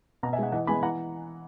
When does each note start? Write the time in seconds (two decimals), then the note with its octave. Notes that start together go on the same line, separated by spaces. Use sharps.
0.23 B2 F#5 A#5
0.33 E5 G#5
0.38 G#3 D#4 D#5 F#5
0.52 E3 D#5 F#5
0.67 G#3 B3 E4 G#5 B5
0.82 E3 F#5 A#5